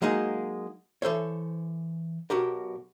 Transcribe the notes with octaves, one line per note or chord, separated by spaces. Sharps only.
F#3 G#3 A#3 D#4 G#4
E3 A4 C5 C#5
B1 F#4 G4 A#4